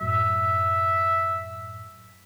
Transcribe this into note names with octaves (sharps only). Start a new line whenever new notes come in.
F#2 A2 F#3 E5